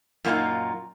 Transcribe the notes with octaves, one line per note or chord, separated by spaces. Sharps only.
F#2 A#2 A#3 B3 D#4 F4